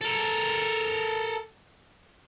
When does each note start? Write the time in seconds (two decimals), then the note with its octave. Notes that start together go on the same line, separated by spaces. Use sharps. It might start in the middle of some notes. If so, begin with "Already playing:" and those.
0.01 A4 A#4